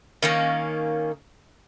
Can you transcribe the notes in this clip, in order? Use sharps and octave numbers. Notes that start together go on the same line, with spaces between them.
D#3 A#3 C#4